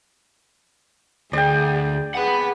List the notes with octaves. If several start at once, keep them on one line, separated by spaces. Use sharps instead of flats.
D2 G#4 D5 G5
G#4 B4 F#5 B5